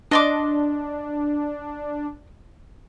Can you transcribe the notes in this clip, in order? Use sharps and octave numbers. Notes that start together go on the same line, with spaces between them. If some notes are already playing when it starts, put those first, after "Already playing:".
D4 D#5 C6 D6